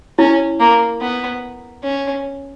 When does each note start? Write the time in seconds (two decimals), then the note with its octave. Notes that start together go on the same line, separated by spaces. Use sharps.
0.19 C#4 E4
0.60 A#3
1.01 B3
1.84 C#4